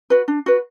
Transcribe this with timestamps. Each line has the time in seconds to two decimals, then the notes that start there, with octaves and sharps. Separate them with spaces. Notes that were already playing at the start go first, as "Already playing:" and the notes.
0.10 F#4 B4
0.28 D4
0.46 F#4 B4